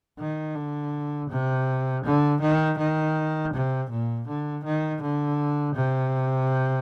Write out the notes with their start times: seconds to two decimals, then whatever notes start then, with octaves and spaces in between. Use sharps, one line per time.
0.19 D#3
0.55 D3
1.30 C3
2.04 D3
2.41 D#3
2.78 D#3
3.54 C3
3.90 A#2
4.27 D3
4.64 D#3
5.02 D3
5.76 C3